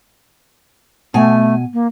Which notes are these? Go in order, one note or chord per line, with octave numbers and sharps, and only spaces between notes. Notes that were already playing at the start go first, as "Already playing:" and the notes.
B2 A3 G#5
A#3